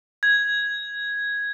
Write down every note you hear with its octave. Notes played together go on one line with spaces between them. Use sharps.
G#6